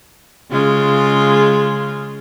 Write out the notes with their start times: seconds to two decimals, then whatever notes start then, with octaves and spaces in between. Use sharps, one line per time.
0.50 C#3 G#3 F4